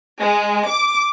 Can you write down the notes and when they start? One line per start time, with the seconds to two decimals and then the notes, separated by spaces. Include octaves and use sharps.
0.21 G#3
0.70 D6